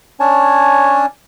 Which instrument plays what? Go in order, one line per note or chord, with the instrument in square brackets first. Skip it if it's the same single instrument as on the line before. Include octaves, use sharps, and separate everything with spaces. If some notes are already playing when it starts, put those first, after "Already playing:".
[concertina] C#4 D4 C#5 G#5 A5